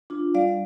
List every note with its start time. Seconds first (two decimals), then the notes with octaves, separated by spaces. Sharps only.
0.10 D4 F4
0.34 G3 D5 F5